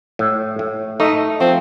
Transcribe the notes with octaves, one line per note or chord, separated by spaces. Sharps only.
A2
A2
A3 D#4
F3 C4